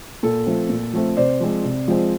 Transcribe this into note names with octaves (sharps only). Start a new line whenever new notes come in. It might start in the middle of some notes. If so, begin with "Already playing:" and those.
A#2 A4
F3 A3 C4
A#2
F3 A3 C4
C3 C5 D5
F3 G#3 C4
C3
F3 G#3 C4